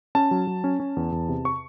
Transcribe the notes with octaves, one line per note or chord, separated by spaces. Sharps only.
C#4 A5
F#3
F#3
C#4
C#4
E2
E2
C3
C#6